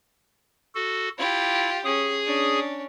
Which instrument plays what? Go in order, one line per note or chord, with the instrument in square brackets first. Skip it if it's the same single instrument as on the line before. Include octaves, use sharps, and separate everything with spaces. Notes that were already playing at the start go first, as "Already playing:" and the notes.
[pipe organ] F#4 A4
[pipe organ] E4 [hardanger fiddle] F4 G4
[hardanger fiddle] C#4 [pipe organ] G#4 D#6
[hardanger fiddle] C#4 D4